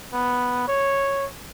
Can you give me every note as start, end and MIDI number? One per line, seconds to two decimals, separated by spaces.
0.13 0.63 59
0.68 1.26 73